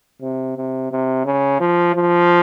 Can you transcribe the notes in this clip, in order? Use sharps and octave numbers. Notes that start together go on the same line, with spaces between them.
C3
C3
C3
C#3
F3
F3